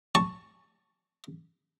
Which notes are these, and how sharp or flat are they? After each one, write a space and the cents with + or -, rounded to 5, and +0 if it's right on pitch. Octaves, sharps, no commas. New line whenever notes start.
A5 +10 C#6 +0